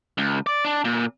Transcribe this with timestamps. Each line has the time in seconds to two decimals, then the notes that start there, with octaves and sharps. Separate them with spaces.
0.18 C#2
0.47 D5
0.65 D4
0.85 A#2